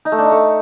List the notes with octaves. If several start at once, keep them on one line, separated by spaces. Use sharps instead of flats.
D#4
A3
D4
D#4
A3